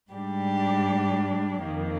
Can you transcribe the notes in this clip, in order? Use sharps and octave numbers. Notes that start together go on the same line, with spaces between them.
G#2 G3 D4 G4
F2 D#3 A#3